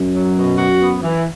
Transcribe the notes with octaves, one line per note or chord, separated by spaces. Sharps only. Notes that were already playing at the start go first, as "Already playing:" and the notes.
Already playing: F#2
F#3
B2
F#4
B3
E3